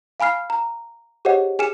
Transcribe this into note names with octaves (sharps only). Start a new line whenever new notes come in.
F5 G#5 B5 F6 C7
A#5
G4 G#4 C5 C#5 D#5 F#5
G#4 G#5 F6 C#7 E7